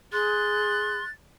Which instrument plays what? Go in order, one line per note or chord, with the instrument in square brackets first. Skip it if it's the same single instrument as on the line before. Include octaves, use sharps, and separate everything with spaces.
[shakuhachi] G#4 [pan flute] C6 [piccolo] F#6 [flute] A6